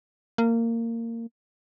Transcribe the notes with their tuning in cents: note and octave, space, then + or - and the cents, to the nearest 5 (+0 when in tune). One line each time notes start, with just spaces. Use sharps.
A#3 -20